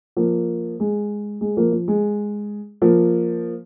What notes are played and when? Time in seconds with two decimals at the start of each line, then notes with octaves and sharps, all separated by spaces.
0.17 F3 A#3
0.80 G#3
1.41 G#3
1.57 F3 A#3
1.72 F3
1.88 G#3
2.82 F3 A#3